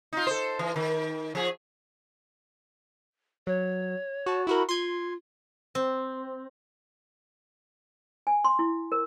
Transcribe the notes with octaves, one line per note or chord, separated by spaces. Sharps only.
D#4 F4
A4 C5
E3
D#3
F3 G#4
F#3 C#5
F#4 A5
E4 F#4 A#4 B5
F4 C6 G#6
C4
G#5
C6
E4
A#4